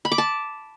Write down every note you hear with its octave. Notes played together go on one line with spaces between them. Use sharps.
B5
D6
A5